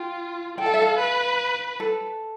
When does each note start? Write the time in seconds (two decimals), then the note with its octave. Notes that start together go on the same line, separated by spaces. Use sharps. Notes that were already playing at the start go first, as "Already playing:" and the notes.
Already playing: F4 G5
0.58 A4 G5
0.66 F5
0.74 E5
0.82 F5
0.99 B4
1.80 A4